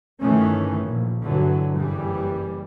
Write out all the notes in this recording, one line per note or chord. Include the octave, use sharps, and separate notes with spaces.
G1 D#3 E3 A3 C#4
A#1
G2 D3 E3 F#3
F#1 C#3 E3 G3